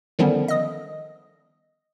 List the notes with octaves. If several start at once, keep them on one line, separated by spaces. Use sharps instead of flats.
D3 D#3 F3 G3 B3 C#4
D#5 D#6